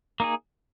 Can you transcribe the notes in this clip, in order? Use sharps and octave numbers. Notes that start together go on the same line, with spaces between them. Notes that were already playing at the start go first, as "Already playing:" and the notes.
A#3 D#4 G#4